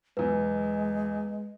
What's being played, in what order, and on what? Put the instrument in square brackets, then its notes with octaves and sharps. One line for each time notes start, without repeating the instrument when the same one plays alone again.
[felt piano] B1 E2 [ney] G#3 [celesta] B4